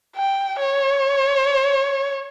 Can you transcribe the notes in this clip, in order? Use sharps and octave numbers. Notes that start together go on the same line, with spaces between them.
G5
C#5